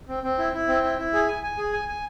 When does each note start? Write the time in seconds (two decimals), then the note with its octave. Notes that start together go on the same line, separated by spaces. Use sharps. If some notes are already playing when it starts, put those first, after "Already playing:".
0.08 C4
0.23 C4
0.39 E4
0.53 E4
0.68 C4
0.84 E4
0.98 E4
1.13 G#4
1.28 G#5
1.43 G#5
1.58 G#4
1.73 G#5
1.88 G#5